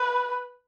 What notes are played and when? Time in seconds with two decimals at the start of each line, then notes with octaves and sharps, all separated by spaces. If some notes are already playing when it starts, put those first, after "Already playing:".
Already playing: B4